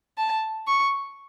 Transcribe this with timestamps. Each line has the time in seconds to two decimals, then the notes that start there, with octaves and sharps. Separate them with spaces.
0.18 A5
0.67 C#6